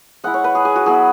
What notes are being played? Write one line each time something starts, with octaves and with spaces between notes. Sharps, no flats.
G#3 E4 F#5
C#5
B4
G#4
G#4
F#4
F#3 B3 E4 G#4